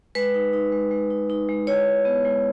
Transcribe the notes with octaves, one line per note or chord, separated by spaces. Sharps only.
G#3 B4
D#4
D#4
G#3
G#3
D#4
D#4
G#3
E4 C#5
G#3
B3
G#3